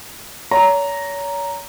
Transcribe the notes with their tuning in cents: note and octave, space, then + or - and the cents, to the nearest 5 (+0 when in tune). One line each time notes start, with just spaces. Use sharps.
C#5 +35 A#5 +0